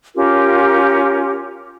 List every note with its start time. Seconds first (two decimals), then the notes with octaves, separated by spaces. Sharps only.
0.15 C#4 F4 G4 A#4